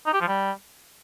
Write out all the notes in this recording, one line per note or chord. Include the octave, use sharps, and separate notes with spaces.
D#4
G4
F3
G3